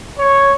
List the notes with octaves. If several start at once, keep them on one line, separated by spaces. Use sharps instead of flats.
C#5